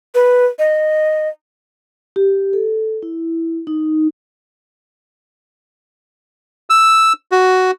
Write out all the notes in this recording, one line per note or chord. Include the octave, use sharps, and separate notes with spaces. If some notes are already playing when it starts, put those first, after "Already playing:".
B4
D#5
G4
A4
E4
D#4
E6
F#4